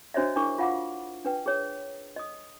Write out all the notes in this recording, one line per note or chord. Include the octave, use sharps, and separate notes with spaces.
D4 F#4 C5 C#5 D#5 E5
D4 E4 G#4 A#4 C#6 D6
F4 F5 F#5 B5 D6
D4 B4 G5
G#4 C#5
D#5 D#6